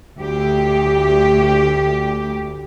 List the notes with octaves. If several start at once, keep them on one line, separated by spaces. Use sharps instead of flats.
D2 G4